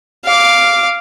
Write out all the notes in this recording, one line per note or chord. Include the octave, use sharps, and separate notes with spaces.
F5 D6